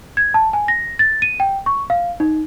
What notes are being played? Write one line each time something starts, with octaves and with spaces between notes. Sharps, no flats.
G#6
A5
G#5
A#6
A6
D#7
G5
C#6
F5
D#4